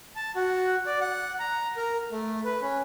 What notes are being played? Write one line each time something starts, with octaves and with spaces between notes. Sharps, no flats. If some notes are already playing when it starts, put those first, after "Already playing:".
A5
F#4
D5
F#5
A#5
A#4
A3
B4
C#4